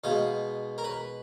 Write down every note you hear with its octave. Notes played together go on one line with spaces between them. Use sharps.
B2 G#3 D#4 F5
A#4
B4